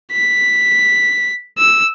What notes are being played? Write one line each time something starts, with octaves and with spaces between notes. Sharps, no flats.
B6
E6